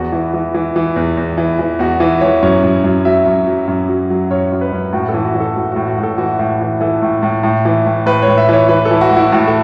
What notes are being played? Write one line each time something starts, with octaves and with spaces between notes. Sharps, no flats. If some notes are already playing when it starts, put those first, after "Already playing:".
Already playing: E2 F#4
E3
E3
E3
E3
E2
E2
E3
E3
E2 F#4
E3
E3 C#5
F#2 C#5
F#2
F#2
F#3 E5
F#2
F#3
F#2
F#3
F#3
F#2 C#5
F#2
B4
F#2
A2 F#4
A4
E3
F#4
E3
A4
A2 F#4
A2 F#4
F#4
A2
A4
E3 F#4
A2
E3
E3 A4
A2
A2
A2
E3
A2
A2 B4
C#5
A2
E5
E3 C#5
E3 B4
A4
E3
F#4
A2
E4
A2 F#4
A4